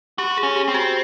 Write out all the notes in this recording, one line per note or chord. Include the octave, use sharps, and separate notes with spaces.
F#4 G4
G#4
C#4
G4
C4
F#4